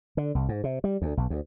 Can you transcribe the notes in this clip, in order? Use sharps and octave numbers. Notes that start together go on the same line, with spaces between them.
D3
C2
G#2
C3
G3
D2
B1
D2